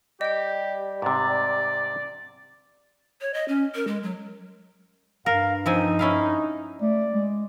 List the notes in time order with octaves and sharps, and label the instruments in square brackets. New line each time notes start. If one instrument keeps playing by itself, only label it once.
[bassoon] G3 [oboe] G4 [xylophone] D#5 G5
[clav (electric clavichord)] G#2 C3 [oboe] D5
[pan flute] C#5
D#5
C#4
A#4
G#3
F#3
[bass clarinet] G2 [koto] A#4 [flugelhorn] F5
[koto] F3 C4 G#5 [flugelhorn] D#4
[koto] C#4 E4 F5
[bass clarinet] A3 [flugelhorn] D5
[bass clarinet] G#3